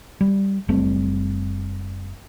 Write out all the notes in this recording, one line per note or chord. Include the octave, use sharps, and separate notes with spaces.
G3
F#1 G3 A3 C4